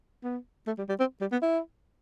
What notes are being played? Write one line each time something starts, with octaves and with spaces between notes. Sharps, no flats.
B3
A3
G3
G3
C4
G3
B3
E4